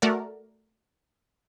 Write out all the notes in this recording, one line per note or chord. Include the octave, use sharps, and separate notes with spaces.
A3 F#4 A#4 D5